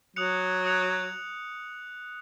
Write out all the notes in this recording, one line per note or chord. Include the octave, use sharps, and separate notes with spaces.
F#3 D#6 F#6 C#7 F7
D#6 F#6 C#7 F7